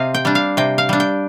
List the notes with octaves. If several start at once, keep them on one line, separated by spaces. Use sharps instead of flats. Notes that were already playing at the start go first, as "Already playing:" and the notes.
Already playing: C3 C4 D#5 F5
G5
G3 D4
F5
C3 G5
F5
G3 D4
G5